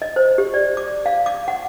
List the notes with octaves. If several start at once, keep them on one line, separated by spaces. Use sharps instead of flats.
D#5
C5
G4
D5
D6
F5
D6
F#5